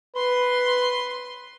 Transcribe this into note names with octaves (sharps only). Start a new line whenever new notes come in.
B4 C6